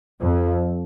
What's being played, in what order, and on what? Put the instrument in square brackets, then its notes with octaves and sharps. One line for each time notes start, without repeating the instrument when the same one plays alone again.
[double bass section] F2